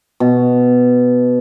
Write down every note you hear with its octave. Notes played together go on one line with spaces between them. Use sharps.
B2